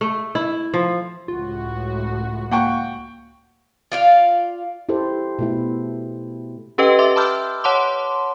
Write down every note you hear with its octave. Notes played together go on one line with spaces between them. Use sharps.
A3
E4
F3
C#2 A2 F4 F#4
A#3 F#5 G5 C#6
F4 D5 F5
E4 G4 A4 C5
B2 A3 E4
C#4 G4 A4 B4 D#5 G5
E5 C6 D6
A5 B5 D6 E6 F6 G6
C#5 F#5 A5 C6 D6